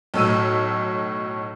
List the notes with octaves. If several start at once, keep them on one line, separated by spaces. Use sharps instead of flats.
B1 A2 E6 D#7